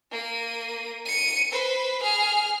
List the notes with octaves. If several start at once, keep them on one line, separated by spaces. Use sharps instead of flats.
A#3 D#7
C#7 D#7
B4 C5
G#4 F6